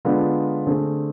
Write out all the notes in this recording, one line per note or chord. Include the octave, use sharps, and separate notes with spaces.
D3 G#3 B3 D4 F4
D3 A3 C4 G#4